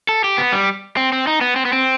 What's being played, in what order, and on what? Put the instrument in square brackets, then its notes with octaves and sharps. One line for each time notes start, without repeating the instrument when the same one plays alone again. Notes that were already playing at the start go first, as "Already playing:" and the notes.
[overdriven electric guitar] A4
G4
B3
G3
C4
C4
D#4
B3
C4
B3
C4